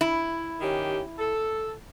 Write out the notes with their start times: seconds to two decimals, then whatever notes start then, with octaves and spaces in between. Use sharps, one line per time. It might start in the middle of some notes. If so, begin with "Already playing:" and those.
0.01 E4
0.61 D#3 C#4 G4
1.18 A4